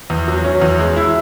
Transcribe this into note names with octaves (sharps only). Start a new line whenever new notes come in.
E2
F#3
C#4
E2
G#3
E4